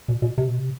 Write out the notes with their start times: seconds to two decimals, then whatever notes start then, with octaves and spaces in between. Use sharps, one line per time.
0.08 B2
0.22 B2
0.38 C3
0.48 B2
0.58 C3